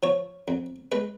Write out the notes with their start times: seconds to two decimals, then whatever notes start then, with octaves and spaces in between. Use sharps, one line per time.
0.03 F3 C#5
0.48 F2
0.92 G#3 B4